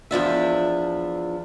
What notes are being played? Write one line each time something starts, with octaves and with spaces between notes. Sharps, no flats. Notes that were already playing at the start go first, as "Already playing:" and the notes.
E2 F3 D4 E5